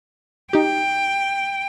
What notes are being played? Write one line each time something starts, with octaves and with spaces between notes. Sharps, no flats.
D#4 G4 G5